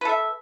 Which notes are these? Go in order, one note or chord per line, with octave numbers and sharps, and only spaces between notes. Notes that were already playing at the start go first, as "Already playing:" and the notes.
A4 B4 E5